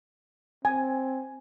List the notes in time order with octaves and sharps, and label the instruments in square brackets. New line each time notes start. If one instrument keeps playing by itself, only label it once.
[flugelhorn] C4 [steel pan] G#5